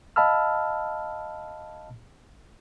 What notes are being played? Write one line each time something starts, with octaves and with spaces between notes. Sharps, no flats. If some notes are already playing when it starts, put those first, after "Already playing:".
D#5 F5 A5 B5 E6 F6